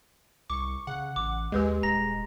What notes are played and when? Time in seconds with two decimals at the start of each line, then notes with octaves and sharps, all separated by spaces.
0.50 C2 C#6 D6
0.87 C#3 F#5
1.16 A1 D6
1.52 D#2 G#3 G4 B4 D#5
1.83 D#1 A#5 A#6